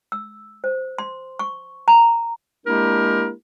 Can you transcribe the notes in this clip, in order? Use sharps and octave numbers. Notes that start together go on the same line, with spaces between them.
E6
C5
C6
C#6
A#5
G#3 A#3 D4 E4 G4 A#4